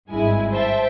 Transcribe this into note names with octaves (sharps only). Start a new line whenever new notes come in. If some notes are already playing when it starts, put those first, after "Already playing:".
G#1 G2 G#3 E4 G#5
C5 E5 G5 A5